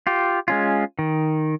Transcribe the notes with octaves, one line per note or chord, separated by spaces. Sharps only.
F4 G4
G#3 C#4 F4
D#3